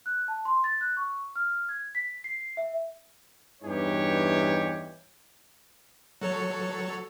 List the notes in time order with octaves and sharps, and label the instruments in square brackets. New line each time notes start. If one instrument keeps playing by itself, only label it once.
[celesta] F#6
A5
C6
A6
F#6
C#6
F6
G#6
B6
C7
E5
[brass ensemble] E2 G2 E3 D#4 G4 C#5
[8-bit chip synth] F#3 A4 C#5